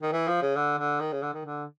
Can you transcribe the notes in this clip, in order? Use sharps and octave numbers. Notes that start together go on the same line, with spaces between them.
D#3
E3
F3
C#3
D3
D3
D#3
C#3
D3
D#3
D3